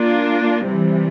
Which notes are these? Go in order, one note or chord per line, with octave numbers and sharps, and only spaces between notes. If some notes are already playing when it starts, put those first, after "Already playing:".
Already playing: A#3 D4 F4
C3 E3 G3